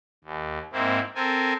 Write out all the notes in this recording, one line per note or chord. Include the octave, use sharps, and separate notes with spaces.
D#2
G#2 A#3 C4 E4
C4 A4 A#4 G#5